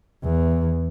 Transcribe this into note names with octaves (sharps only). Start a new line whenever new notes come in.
E2